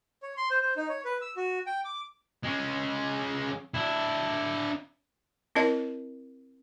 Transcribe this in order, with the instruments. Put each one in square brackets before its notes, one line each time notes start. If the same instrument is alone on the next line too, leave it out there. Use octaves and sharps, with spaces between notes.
[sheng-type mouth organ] C#5
C6
C5
C5
D#4
C#5
B4
E6
F#4
G5
D6
[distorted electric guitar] G#3 C#4
D4 E4
[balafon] C4 E4 A#4 C#5 D#5